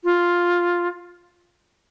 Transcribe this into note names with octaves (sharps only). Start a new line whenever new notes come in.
F4